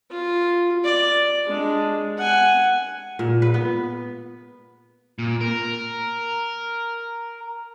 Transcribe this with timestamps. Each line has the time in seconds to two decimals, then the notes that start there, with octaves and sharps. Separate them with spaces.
0.11 F4
0.84 D5
1.47 G#3 D4
2.18 F#5 G#5
3.19 A#2
3.42 B4
3.54 B3
5.19 A#2
5.41 A#4